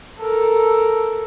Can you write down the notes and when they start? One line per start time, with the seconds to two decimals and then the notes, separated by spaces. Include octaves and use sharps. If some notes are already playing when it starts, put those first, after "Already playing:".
0.19 A4 A#4